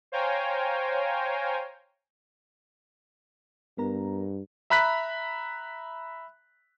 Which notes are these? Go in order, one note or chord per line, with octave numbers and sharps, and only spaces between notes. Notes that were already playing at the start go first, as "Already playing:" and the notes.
C5 C#5 F5 G5 G#5 A#5
G2 B3 A#4 A#5
E5 A#5 B5 F#6 B6